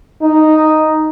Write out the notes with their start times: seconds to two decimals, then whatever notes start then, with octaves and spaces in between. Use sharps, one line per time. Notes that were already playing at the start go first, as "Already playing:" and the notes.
0.22 D#4